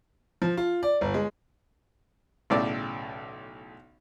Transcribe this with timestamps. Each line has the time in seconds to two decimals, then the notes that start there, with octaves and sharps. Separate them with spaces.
0.42 F3
0.57 F4
0.83 D5
1.01 G1
1.14 G#3
2.50 B1 A2 C#3 D5